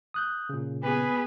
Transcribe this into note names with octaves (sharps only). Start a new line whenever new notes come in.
D#6 F#6 G6
A#2 C#3
B3 G#4 B4